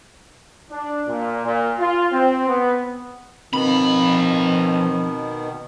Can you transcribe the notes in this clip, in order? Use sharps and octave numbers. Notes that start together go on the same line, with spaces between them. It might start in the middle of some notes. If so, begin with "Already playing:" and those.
D4
A#2
A#2
F4
C4
B3
B2 D#3 F3 B3 C4 B5